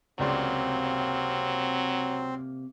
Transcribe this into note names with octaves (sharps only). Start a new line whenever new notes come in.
C#2 C3 F#3 A#3 C4 D5 C6